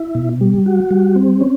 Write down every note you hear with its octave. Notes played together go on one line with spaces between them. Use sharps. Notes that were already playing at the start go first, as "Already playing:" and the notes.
Already playing: E4
B2
G3
F#4
G3
C4
C#4